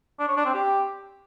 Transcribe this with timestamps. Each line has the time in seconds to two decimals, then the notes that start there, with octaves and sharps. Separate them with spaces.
0.19 D4
0.28 C#5
0.37 D4
0.45 C4
0.54 G4